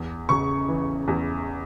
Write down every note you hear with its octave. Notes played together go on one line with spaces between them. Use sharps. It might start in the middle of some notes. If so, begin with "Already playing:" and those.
Already playing: E2
C#3 C#6
E3
E2